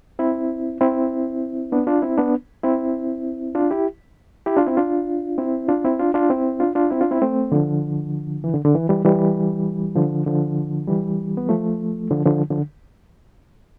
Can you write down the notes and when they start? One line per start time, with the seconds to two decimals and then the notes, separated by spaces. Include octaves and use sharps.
0.19 C4 E4
0.81 C4 E4
1.72 B3 D4
1.87 D4 F4
2.02 C4 E4
2.18 B3 D4
2.64 C4 E4
3.55 D4 F4
3.71 E4 G4
4.46 E4 G4
4.56 D4 F4
4.67 C4 E4
4.77 D4 F4
5.38 C4 E4
5.68 D4 F4
5.85 C4 E4
5.99 D4 F4
6.14 D4 F4
6.30 C4 E4
6.60 D4 F4
6.75 D4 F4
6.91 C4 E4
7.01 D4 F4
7.11 C4 E4
7.22 A3 C4
7.52 D3 F3
8.44 E3
8.54 D3
8.65 D3
8.75 E3
8.89 E3 G3
9.05 E3 G3
9.96 D3 F3
10.26 D3 F3
10.88 E3 G3
11.37 B3
11.49 F3 A3
12.11 D3 F3
12.26 D3 F3
12.50 D3 F3